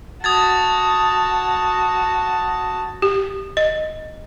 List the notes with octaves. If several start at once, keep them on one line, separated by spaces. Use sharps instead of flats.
F#4 A5 D#6 G#6 A6
G4
D#5